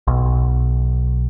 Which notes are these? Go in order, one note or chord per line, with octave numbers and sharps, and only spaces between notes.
B1